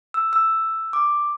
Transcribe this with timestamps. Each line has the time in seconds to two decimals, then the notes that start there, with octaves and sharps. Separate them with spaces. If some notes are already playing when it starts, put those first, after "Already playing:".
0.14 E6
0.33 E6
0.93 D6